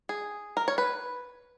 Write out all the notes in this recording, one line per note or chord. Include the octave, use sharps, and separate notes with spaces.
G#4
A#4
C#5
B4